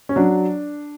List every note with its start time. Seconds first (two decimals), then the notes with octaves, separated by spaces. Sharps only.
0.09 C#4
0.16 F#3 D4